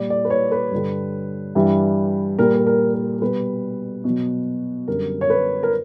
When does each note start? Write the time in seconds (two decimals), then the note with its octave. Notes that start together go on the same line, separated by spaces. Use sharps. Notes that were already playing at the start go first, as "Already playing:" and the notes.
Already playing: A#2 G3 D5
0.10 D5
0.25 B4
0.30 C#5
0.52 B4
0.71 G2 D3 G3
1.55 G2 E3 G3
2.38 A#2 G3 A#4
2.54 A#4
2.67 A#4
2.94 A#4
3.21 B2 G3 B4
4.04 B2
4.09 F#3
4.88 F#2 D3 G3 A#4
5.21 C#5
5.30 B4
5.63 A#4